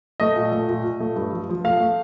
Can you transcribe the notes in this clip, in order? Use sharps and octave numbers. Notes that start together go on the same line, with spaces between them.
A3 D#5
A#2
A3
A#2
A#2
A3
G2
F3
F3
A3 F5
A3